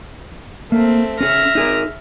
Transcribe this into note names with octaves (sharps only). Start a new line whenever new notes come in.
A3 A#3 C4
C#4 G#4 E5 F6 A#6
D#4 G#4 A#4